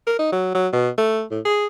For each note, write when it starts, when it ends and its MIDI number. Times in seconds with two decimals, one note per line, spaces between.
0.07 0.18 70
0.19 0.30 63
0.32 0.51 54
0.54 0.68 54
0.73 0.89 47
0.98 1.23 57
1.31 1.40 45
1.45 1.66 68